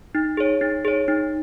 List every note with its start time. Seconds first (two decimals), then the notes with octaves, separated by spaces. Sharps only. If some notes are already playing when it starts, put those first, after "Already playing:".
0.15 D#4
0.37 G#4 C#5
0.61 D#4
0.85 G#4 C#5
1.08 D#4